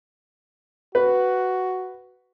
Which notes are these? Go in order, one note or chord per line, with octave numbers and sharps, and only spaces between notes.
F#4 B4